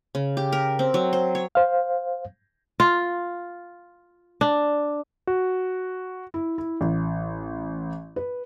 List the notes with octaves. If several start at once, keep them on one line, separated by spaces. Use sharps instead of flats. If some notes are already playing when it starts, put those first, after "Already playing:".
C#3
G4
A#4
C4
F#3
C5
C#5
C5 F5
F4
D4
F#4
E4
E4
A1
B4